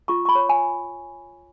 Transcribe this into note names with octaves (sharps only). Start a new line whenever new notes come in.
F4 C#6
C#6
B5
C#5
G#5